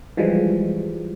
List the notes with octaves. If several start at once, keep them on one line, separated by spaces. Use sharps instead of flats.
E3 F3 G3 G#3